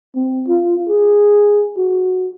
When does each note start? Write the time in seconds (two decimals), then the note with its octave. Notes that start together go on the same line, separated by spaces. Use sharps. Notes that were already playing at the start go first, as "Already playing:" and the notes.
0.16 C4
0.48 F4
0.89 G#4
1.77 F#4